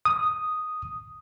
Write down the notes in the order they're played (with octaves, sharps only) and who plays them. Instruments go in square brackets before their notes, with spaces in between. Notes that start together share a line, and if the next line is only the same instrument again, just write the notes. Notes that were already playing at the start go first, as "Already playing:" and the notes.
[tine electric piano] D#6